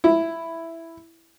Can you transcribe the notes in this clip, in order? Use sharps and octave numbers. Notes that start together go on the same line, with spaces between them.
E4